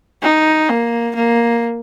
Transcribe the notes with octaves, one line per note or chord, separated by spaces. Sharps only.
D#4
A#3
A#3